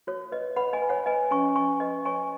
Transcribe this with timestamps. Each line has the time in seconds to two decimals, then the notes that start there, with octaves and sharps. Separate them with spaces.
0.07 F#4 C#5
0.32 B4 D#5
0.56 B4 F#5 B5
0.73 D#5 G#5
0.82 B4
0.89 C#5 F#5
1.06 B4 D#5 G#5
1.31 C#4 G#5 C#6
1.56 C#4 G#5 C#6
1.80 B4 D#5
2.05 C#5 G#5 C#6